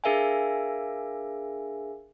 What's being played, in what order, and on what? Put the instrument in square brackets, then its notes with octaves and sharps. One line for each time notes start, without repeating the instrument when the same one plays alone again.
[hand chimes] D4 G#4 A#4 E5 F5 G#5